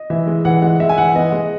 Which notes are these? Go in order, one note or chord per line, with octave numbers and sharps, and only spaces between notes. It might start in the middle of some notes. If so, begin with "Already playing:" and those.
Already playing: D#5
E3 E5
G#3
E3 F#5
G#3 F#5
G#3 E5
G#5
E3 F#5
B3 D#5
G#3